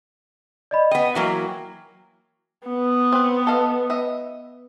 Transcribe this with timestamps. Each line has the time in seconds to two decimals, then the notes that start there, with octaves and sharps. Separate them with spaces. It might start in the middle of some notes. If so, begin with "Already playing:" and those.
0.71 D5 D#5 B5
0.91 B3 D#5 G5
1.15 E3 F#3 A#3
2.68 B3
3.12 C4 B4
3.47 A4 D#5 F5
3.90 D#5 E5